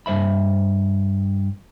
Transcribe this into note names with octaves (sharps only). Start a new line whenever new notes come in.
G2 C5 E5 B5